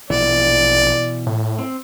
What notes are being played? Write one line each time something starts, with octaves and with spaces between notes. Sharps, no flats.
A#1 B2 E3 D5
A2
C4